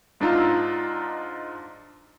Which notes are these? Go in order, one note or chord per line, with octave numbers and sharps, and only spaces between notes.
G#2 D4 D#4 F4 A#5 E6